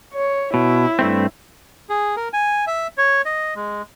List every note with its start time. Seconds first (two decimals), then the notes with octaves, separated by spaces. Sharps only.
0.14 C#5
0.54 B2 E4
0.99 G2 A3 C4
1.89 G#4
2.17 A#4
2.33 G#5
2.67 E5
2.98 C#5
3.25 D#5
3.56 G#3